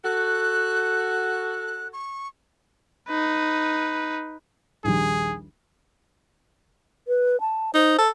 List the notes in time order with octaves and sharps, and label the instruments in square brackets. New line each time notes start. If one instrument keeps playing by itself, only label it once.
[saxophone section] F#4 A4 [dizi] F#6
[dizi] C#6
[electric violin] D#4 B4
[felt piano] A#1 D#2 G3 [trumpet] G#4
[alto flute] B4
A5
[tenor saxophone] D#4 [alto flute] C5
[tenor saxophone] A4